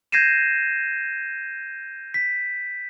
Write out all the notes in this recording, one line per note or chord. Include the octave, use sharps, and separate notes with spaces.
G6 G#6 A#6 C7 D#7 E7
B6